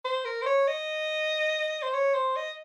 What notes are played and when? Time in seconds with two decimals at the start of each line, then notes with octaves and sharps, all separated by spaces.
0.05 C5
0.25 A#4
0.42 C5
0.46 C#5
0.68 D#5
1.82 C5
1.94 C#5
2.15 C5
2.36 D#5